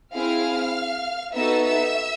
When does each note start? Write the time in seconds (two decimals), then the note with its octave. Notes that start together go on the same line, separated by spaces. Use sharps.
0.14 C4 E4 G#4 F5 F6
1.35 B3 D#4 F#4 A4 E5 E6
1.65 E5 E6